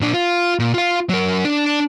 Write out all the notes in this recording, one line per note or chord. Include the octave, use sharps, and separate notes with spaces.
A#2 D4
F4
A#2
F4 F5
F#3 A#4
D4 D5